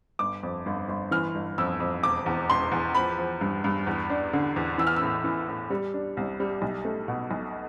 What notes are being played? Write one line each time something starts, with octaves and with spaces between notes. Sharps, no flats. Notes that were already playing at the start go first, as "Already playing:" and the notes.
G1 D6
F2
G1
G1
E3 F6
G1
F2 E6
F2
E1 D6
E2
E1 C6
E2
F3 B5
F3
G2
G2
E2
D4
D3
E2
E3 E6
F6
A2 E6
E3
A2
G3
D4
C2
G3
B1
A3
B2
B1